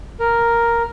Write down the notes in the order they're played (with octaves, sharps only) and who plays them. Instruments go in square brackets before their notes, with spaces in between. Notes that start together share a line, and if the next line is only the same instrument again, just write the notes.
[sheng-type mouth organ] A#4